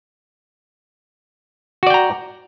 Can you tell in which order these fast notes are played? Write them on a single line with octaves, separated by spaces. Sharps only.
F#4 D5 G5 A#5